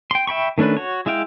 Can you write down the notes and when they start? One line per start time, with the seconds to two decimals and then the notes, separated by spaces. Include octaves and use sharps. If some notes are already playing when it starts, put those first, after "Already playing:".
0.11 G5 C6
0.27 E5 G5 B5 C#6
0.58 D#3 A3 C#4 D4 B4
0.77 F#4 C#5
1.06 G#3 E4 E5 F5 G5